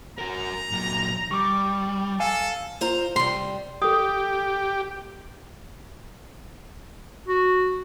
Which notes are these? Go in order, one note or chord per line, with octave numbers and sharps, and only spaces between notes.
F#4 A#4 A#5
A#2 F#3
G3 C#6 D6
A4 F5 G#5
F4 C5 A#5
C3 G3 C6
G4 A4 D#6
F#4